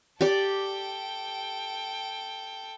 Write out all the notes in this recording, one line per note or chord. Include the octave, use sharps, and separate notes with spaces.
G4 A4 D5 G5